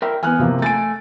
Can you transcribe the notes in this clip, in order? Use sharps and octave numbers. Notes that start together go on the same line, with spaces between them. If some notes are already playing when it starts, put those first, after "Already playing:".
A#4 E5 G5
E2 B3 G#5 F6 F#6
C3 F3 A#3
A3 G#5 A6 D7